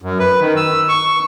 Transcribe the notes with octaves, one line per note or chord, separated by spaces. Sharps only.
F#2
B4
D#3
E6
C#6